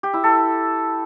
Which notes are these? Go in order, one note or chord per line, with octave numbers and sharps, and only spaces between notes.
G4
E4
A4